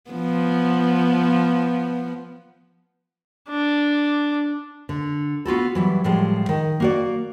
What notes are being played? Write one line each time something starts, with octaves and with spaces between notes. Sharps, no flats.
F3 B3
D4
D3
B3 F4 F#4 A4
E3 F#3 G3
A2 F3 G3 G#3 A5
D#3
A#3 F#4 D5